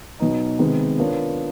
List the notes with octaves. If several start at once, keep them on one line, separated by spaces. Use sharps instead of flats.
B2 F#3 B3 D#4
C3 D#3 G#3 B3
B3 D4 F4 A#4 C#5